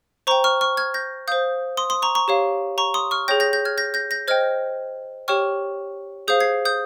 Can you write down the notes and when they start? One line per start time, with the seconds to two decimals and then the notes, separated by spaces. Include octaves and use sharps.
0.27 C5 G5 A#5 C#6
0.44 C#6 F6
0.61 C#6 F6
0.77 F6 G#6
0.94 G6 A#6
1.27 C5 F5 D#6 G6
1.77 C6 D#6
1.90 C6 D#6
2.02 A#5 C#6
2.15 A#5 C#6
2.28 G4 C#5 F5
2.78 A#5 C#6
2.94 C6 D#6
3.11 C#6 F6
3.28 G#4 C#5 G5 G6 A#6
3.40 G6 A#6
3.53 G6 A#6
3.65 F6 G#6
3.78 G6 A#6
3.94 G6 A#6
4.11 G6 A#6
4.28 C5 D#5 G5 F6 G#6
5.28 G4 C#5 G5 C#6 F6
6.28 G#4 C5 F5 D#6 G6
6.40 G#6 C7
6.65 D#6 G6